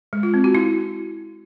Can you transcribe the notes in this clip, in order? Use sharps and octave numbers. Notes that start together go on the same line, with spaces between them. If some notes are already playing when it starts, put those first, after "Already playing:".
G#3
F4
C4
F#4
E4